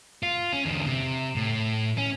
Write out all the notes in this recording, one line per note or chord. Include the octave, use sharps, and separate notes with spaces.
F4
C#4
E2 D3
C3
A2
C#4